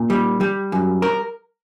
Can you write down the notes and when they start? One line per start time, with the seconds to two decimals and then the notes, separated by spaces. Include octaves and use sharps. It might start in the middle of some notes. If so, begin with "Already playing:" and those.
Already playing: A#2
0.10 G3
0.41 G3
0.72 F#2
1.02 A#4